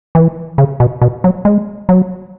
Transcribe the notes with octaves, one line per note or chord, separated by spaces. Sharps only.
E3
C#3
B2
B2
F#3
G#3
F#3